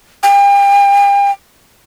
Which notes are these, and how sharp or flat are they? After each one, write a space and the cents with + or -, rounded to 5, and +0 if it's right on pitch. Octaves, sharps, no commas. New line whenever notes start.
G5 +40